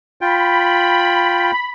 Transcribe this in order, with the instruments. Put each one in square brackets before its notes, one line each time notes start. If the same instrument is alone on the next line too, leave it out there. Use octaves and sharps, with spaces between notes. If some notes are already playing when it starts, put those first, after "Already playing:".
[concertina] F4 G5 [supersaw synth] B5